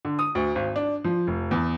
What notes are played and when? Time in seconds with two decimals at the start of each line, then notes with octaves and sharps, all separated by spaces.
0.05 D3
0.19 D#6
0.35 D2
0.55 G#1
0.76 D4
1.04 F3
1.27 F1
1.51 E2